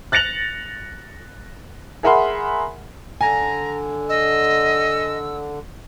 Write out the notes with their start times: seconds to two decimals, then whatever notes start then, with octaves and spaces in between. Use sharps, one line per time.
0.12 F#6 A6 A#6 C#7 F7 F#7
2.03 G#4 A#4 E5 F#5 B5 C6
3.21 D3 G#5 A#5
4.09 D#5 E6